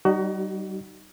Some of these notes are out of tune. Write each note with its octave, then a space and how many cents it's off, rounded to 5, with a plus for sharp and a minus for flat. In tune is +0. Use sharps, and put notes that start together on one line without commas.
G3 -30 D#4 -15 F#4 +30